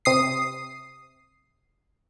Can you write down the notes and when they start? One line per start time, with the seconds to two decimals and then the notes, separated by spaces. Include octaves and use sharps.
0.05 C3 D#6 C7